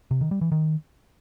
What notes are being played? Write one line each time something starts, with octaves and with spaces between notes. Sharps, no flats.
C3
D#3
G3
E3
D#3